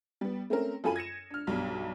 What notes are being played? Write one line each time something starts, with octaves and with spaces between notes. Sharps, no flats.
G3 B3
A3 C4 C#4 A#4
F#2 F4 A4 G#5 B5 D#7
G#6 A#6 C#7 E7
D4 F6
B1 G2 B2